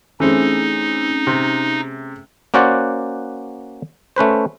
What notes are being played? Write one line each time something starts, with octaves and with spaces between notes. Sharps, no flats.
E3 A3 C4 C#4 D#4 G#4 C5
C3
A#3 C#4 F#4 C5 D5 F#5
A3 C#4 B4 C5